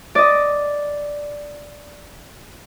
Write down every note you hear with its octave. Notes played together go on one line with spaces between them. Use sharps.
D5 D#5